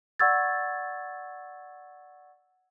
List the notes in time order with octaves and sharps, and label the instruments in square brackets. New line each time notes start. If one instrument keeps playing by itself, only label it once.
[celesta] D5 F#5 C#6 E6 G#6 A6